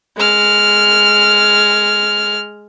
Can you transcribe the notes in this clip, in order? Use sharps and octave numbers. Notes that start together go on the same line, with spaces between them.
G#3 F6